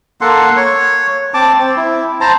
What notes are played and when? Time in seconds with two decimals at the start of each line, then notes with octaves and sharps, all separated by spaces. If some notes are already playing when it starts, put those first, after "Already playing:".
0.21 A#3 A4 F#5 C6
0.57 C#5
1.34 C4 A5 D6
1.59 C4
1.77 E4
2.21 C5 A5 A#5